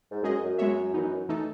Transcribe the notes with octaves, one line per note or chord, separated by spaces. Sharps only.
G#2
F#2 G#3 C#4 G#4 D#5
F#2
G#3 B3 F#4 C#5 E5
E3 B3 D#4
E3 A3 D#4 A4